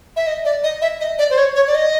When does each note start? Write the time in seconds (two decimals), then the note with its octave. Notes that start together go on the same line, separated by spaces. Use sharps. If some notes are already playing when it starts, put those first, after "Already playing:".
0.16 E5
0.27 D#5
0.45 D5
0.64 D#5
0.82 E5
1.00 D#5
1.19 D5
1.30 C5
1.38 C#5
1.56 C#5
1.67 D5
1.75 D#5